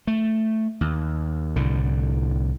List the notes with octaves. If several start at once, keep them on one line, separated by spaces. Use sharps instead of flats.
A3
D#2
C2 A2 D3